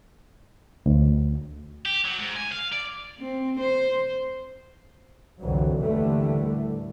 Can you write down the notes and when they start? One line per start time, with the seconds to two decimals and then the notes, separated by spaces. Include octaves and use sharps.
0.86 D2
1.86 G4
2.05 F#3
2.19 G#2
2.36 G#5
2.52 F5
2.72 D5
3.19 C4
3.60 C5
5.41 C2 F2 D3 E3 F#3
5.80 D#2 A2 D3 E3 G3 A3